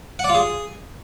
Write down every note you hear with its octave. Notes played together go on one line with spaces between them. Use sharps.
F#5
D5
F4
G#4